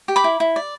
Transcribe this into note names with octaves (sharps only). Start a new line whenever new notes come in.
G4
B5 D6
E4
E4
D5